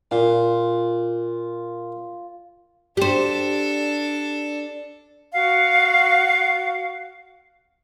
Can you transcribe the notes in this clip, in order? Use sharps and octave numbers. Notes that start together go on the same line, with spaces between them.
A#2 F4
D4 G4 A4 C5
F#4 F5 F#5